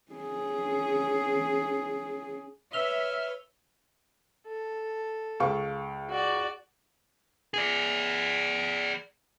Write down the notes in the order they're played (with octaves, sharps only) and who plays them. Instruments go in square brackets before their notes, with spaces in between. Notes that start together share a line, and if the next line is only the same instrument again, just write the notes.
[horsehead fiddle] C#4 G#4
[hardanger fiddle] B4 C#5 [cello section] E5 [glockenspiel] E6 F7 G7 [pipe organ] F6
[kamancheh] A4
[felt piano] C#2 F5 C#6
[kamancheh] F#4 D5
[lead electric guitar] G#4 D5